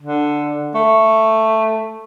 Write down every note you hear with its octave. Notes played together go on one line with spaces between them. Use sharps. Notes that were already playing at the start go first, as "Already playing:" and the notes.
D3
A3